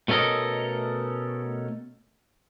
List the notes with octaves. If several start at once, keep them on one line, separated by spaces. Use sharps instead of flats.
B2 A3 C#4 A4 A#4 D#5